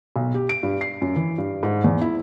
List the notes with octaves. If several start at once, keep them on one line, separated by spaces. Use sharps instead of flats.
B1
G4
D7
G2
C7
F#2
E3
G2
G#2
E2
E4